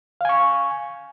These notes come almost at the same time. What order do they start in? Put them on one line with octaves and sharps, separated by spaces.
F5 G#5 C#6